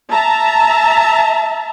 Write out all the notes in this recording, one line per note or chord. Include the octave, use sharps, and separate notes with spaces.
E5 A5 A#5